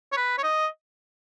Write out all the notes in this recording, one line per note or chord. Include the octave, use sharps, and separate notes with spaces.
C#5
B4
C#5
D#5